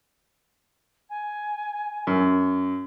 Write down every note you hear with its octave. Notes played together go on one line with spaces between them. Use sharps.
G#5
F#2